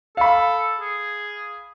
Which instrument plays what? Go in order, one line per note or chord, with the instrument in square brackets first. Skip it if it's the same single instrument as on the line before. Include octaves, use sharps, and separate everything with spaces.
[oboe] A4 [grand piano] F5 B5
[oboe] G#4